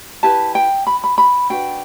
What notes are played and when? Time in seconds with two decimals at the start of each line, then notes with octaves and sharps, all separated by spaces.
0.23 E4 G4 B4 A5
0.55 G5
0.87 B5
1.04 B5
1.18 B5
1.50 D4 F#4 B4 G5